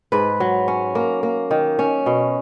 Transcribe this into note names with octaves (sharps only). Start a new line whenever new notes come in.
G#2 B4
F#3
C#4
A#3
A#3
D#3
C#4
B2